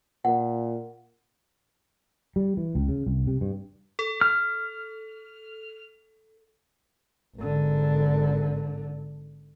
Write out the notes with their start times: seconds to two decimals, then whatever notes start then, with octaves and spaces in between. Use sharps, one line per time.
0.25 A#2 F#5
2.36 G3
2.57 E3
2.75 C#2
2.89 C#3
3.06 C2
3.27 C3
3.41 G2
3.99 A4
4.21 F6
7.37 G#1 D3